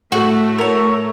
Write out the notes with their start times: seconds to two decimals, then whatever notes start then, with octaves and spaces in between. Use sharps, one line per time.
0.12 A2 A3 F#4
0.59 A#4 C#5